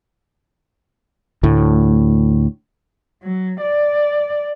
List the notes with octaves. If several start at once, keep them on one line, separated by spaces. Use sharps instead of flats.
D2 A2
F#3
D5